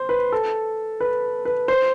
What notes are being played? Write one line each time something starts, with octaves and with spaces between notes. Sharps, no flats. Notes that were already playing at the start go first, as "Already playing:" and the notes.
Already playing: C5
B4
A4
B4
B4
C5